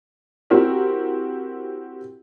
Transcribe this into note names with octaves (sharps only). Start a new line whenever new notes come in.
C4 E4 F#4 G4 A#4